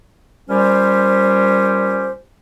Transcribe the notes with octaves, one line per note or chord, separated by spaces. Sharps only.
A#2 G3 C#4 G4 C5